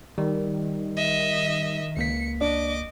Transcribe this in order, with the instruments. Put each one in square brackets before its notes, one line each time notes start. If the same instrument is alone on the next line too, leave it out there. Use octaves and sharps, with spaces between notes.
[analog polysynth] D#3 [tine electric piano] G3
[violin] D#5 E5
[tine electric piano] C#2 A#3 B6 [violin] C#7
[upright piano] D4 [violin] D#5 D6